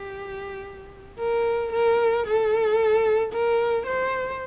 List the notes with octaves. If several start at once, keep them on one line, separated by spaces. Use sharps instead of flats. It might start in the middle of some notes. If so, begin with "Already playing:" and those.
Already playing: G4
A#4
A#4
A4
A#4
C5